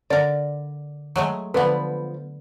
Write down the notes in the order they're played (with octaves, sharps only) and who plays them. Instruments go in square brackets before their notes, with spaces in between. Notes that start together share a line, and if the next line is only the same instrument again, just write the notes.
[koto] D3 A#4 [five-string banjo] D5
[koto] F#3 G#3 A3
[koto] D3 B3 [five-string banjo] F3 A#3 B4